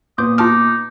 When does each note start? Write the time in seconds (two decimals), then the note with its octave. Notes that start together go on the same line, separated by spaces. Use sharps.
0.18 A#2 B3 C6 D6 D#6 G6
0.38 D#4 F4 A5 D6 F6